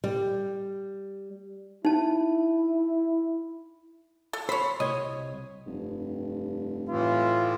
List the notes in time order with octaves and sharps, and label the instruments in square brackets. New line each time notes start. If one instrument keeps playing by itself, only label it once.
[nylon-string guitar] G3
[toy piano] D#4 A5 [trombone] E4
[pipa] A4
[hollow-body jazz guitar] C5 [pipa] C#5 B5
[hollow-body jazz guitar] C2 C#5 [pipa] D#5
[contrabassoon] F1 [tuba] G2
[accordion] A2 E3 [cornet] F4